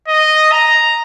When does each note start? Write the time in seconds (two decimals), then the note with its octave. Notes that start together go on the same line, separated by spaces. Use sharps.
0.08 D#5
0.52 A#5